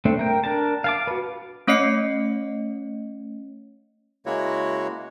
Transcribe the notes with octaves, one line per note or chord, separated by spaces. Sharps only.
A3 C4 D4
A#4 G5
D4 A#4 A5
F5 A5 D6
F#4 B4
A3 C#4 C#5 D#5 C7 C#7
C#3 G#3 A#3 E4 F#4 C#5